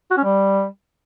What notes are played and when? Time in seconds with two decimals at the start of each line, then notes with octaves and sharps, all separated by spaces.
0.11 F#4
0.18 C#4
0.24 G3